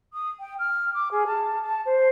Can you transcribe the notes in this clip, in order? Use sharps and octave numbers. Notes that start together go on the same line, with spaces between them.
D#6
G5
F6
D6
G#4
A5
A5
C5